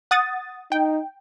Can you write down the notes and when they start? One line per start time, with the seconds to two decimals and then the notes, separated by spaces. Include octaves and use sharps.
0.11 F#5 D#6 A6
0.72 D#4 G5